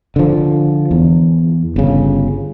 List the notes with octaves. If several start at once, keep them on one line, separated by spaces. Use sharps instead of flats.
D3 F3
E2
G1 C#3